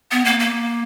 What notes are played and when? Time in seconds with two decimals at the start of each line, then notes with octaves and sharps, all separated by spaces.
0.11 B3
0.25 A#3
0.40 A#3